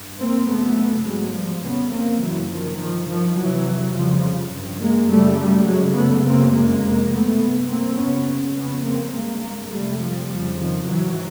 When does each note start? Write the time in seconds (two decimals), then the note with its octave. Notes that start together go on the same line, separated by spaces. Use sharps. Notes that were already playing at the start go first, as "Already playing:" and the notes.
Already playing: G2
0.19 A#3 C4
0.48 F#2 C#3 A3 B3
1.06 G#2 F#3 G#3
1.35 F3 G3
1.64 F2 C#3 B3 C#4
1.92 A#3 C4
2.21 F#2 C#3 E3 F#3
2.50 D#3 F3
2.79 G2 D#3 F3
3.08 D#3 F3
3.37 F2 C3 E3 F#3
3.94 F2 C#3 F3 G3
4.53 G2
4.82 G#3 A#3
5.10 F#2 C#3 G3 A3
5.38 G3 A3
5.67 F#2 C#3 F#3 G#3
5.97 A3 B3
6.25 F#2 C#3 A#3 C4
6.54 G#3 A#3
6.83 F2 C3
7.12 A3 B3
7.41 G2
7.69 A#3 C4
7.98 F#2 C#3 B3 C#4
8.56 F2 C#3 B3 C#4
8.85 A#3 C4
9.14 G2 G#3 A#3
9.71 F2 C3 G3 A3
10.00 F3 G3
10.29 F2 C#3 F3 G3
10.58 D#3 F3
10.87 G#2 E3 F#3